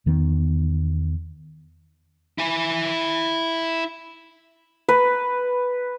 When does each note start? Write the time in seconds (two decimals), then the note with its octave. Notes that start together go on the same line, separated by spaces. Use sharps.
0.06 E2 D#3 B3
2.38 E4 G#5
4.89 B4